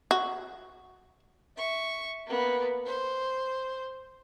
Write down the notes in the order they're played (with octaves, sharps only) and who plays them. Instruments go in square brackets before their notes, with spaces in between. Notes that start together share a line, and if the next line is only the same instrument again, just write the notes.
[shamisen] F#4
[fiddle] E5 C#6
A#3 B3
C5